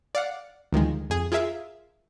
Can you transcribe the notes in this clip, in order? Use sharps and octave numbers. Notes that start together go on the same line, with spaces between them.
D5 F5 F#5
D2 D#3 F3 G#3
F2 G#4
F4 G#4 A#4 E5 F5